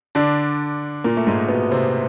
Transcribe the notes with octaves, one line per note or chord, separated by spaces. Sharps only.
D3 D4
A#2 A#3
A3
G#2 G#3
B2 B3
C3 C4